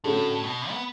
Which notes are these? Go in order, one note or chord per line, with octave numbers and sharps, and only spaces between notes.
A2 D3 A3 C#4 F#4
B2
B3